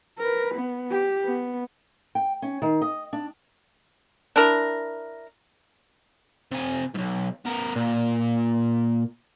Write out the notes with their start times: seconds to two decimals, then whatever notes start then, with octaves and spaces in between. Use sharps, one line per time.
0.19 A#4 B4
0.55 B3
0.91 G4
1.25 B3
2.15 G5
2.42 C#4
2.62 D#3
2.82 D#5
3.13 D4
4.36 D4 E4 A#4
6.52 C3 G#5
6.95 B1 G#2
7.45 B3 A#4
7.76 A#2